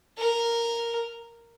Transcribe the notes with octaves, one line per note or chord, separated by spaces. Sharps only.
A#4